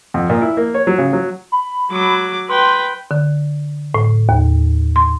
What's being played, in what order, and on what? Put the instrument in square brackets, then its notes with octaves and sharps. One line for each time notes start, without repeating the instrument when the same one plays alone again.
[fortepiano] F2
A#2
E4
A#3
C#5
F#3
C#3
F#3
[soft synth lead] B5
[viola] F#3 D6
[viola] B4 G5 [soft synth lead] C6
[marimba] D3
A2
D#2
C6